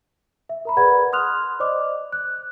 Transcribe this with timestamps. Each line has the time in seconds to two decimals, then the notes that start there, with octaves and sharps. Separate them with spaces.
0.49 E5
0.65 A#4 A#5 B5
0.77 G#4 B4 D5 F#5 B5 G#6
1.13 C6 D#6 F6 F#6 F7
1.60 C5 D5 D#5 D6
2.13 F#6